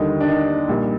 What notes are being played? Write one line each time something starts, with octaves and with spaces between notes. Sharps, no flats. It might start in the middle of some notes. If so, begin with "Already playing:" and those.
Already playing: D#2 D3 G3 A#3 D#4
D4
D#4
A#1 A#2 G3